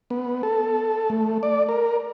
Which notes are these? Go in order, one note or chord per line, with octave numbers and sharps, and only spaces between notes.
B3
A4
A3
D5
A#4